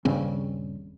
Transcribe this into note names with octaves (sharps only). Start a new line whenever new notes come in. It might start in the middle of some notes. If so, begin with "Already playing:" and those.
D#1 G2 C#3 C4